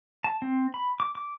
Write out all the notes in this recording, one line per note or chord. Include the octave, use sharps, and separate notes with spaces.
A5
C4
B5
D6
D6